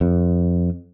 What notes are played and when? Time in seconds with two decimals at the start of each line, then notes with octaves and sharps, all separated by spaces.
0.01 F2